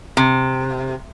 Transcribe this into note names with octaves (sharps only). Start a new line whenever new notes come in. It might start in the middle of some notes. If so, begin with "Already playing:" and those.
C3